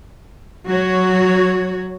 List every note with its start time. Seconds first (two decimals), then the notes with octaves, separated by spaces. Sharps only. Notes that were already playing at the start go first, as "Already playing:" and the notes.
0.67 F#3 F#4 C#5